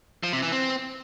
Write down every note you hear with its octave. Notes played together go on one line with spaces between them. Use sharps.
F3
C3
E3
C4